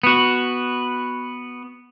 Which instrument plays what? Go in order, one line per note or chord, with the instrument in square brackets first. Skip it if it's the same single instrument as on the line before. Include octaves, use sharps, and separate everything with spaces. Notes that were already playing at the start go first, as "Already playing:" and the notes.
[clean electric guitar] B3 F#4